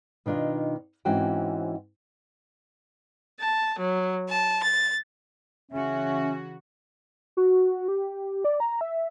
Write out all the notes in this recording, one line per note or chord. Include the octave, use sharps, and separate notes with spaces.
B2 D#3 D4 D#4 F4
G#2 E3 C4 C#4 F#4 G5
A5
F#3
A5
A6
C#3 E3 C#4 F#4 E5
F#4
G4
D5
A#5
E5